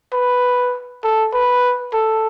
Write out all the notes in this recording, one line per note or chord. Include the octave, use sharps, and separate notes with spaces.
B4
A4
B4
A4